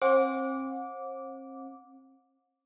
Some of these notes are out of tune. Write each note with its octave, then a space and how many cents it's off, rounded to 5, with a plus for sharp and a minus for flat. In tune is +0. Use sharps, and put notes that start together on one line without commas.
C4 +35 F#5 -40 D6 -15